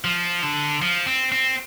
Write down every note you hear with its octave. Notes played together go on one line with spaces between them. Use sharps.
F3
D3
F3
C4
C4